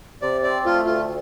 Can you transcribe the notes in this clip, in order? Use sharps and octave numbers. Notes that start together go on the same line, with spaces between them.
C3 D5
C4 D5
A3 F4
D2 F4